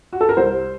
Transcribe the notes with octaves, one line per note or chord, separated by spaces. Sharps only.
F#4
A4
A#4
C2 C5